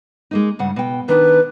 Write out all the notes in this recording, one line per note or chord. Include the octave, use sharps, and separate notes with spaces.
G#3 A#3 D#4
G2 C#3 F#5
B2 G5
D#3 D4 B4